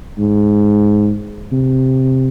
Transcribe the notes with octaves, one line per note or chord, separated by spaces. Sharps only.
G#2
C3